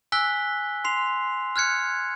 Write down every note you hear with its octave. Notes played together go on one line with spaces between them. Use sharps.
G#5 E6 F#6 B6 G7
C6 C7 F7
F6 F#6 G#6 C#7